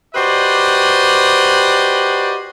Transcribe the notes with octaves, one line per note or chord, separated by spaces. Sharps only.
F#4 G4 B4 C5 D5 D#5